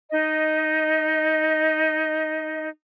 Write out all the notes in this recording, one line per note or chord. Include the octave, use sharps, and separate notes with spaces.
D#4 D#5